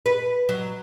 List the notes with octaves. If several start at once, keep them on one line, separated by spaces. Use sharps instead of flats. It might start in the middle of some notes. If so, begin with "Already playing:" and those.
B4
F#3